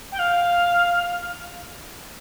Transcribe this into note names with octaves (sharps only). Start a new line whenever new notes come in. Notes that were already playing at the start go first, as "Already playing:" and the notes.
G5
F5